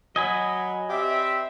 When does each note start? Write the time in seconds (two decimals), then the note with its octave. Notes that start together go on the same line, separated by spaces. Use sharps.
0.16 F#3 D#5 G#5 B5
0.90 C4 G4 D5 E5